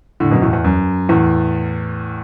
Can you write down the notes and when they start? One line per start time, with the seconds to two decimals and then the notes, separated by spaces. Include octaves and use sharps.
0.20 A2 D3
0.31 F#2 B2
0.42 E2 A2
0.53 E2
0.64 F#2
1.09 E2 A2